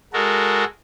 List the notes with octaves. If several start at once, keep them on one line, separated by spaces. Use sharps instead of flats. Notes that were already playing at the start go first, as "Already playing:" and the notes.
G#3 F#4 A4 A#4